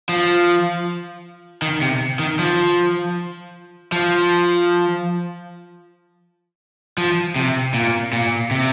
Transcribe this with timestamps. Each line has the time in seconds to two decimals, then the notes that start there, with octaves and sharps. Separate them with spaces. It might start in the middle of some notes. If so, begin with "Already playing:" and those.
0.09 F3
1.62 D#3
1.82 C3
2.19 D#3
2.39 F3
3.92 F3
6.98 F3
7.36 C3
7.74 A#2
8.13 A#2
8.51 C3